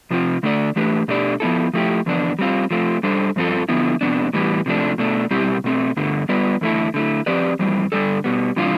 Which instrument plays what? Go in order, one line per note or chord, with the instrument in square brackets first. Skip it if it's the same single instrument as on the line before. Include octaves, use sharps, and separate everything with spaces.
[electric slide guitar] C3 F3 C4 F4
D3 A3 D4 A4 D5
E3 A3 D4 G4 B4
B2 A3 D4 G4 D5
F3 B3 E4 A4
F3 A3 E4 G4
E2 D3 F3 B3 D4
G3 C4 F4
F3 A3 C4 F4
G3 D4 A4 C5
G2 F3 C4 F4 A4
D3 F3 B3 E4
F2 C3 F3 B3 D4
A2 E3 G3 B3
C3 F3 A3 D4
B2 A3 D4
B2 G3 C4 E4 G4
B2 A3 C4
G2 D3 A3
G3 B3 F4 B4 D5
E2 D3 A3 E4 A4
D3 A3 E4
F3 C4 G4 B4 D5
F2 E3 G3 C4
G2 D3 G3 D4 A4
B2 G3 B3
C3 E3 G3 D4 F4